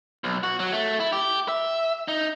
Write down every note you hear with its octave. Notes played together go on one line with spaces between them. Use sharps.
B1
F#4
F#3
A3
E4
G4
E5
D#4